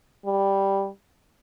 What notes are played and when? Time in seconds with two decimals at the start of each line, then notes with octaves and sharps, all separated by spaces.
0.25 G3